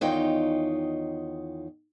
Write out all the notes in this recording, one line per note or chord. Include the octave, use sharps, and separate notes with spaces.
E2 D#3 D#4 F4 C#5 G5